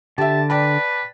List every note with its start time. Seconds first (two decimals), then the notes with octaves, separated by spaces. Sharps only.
0.18 D3 G4 E5 A5
0.50 B4 D5 G5 A5